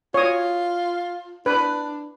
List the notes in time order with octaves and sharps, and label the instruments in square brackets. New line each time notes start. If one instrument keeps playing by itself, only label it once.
[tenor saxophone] F4 [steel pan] C#5 D#6
[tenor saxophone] D4 [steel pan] B4